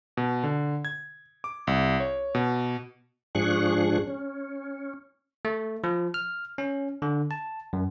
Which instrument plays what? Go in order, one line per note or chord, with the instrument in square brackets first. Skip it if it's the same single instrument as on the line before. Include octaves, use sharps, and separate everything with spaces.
[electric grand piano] B2
D3
G#6
D6
C2
C#5
B2
[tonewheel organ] G#2 F3 D4 G#4 C#6 F#6
C#4
[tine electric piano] A3
F3
F6
C#4
D3
A5
F#2